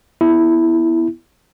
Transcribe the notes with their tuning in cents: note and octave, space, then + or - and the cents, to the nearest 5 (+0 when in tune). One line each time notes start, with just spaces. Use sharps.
B3 -5 E4 +0